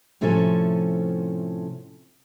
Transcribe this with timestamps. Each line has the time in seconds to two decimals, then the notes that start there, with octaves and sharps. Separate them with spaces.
0.21 A2 C3 F3 C#4 A4 G#5